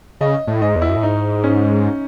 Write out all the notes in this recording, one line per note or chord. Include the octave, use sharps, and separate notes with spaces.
C#3 D#5
A2
G#2 D#5
E2
E4
F#2
A2
G#2 D#4
C#4